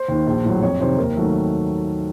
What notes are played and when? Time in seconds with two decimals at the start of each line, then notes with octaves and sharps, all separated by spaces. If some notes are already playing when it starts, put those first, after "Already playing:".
Already playing: C5
0.08 D#2 D#3
0.27 A#1
0.44 A2 F#3
0.62 F2 C#5
0.80 C3 D#3 C5
0.98 D#2 A#4
1.17 D#3 F#3 A3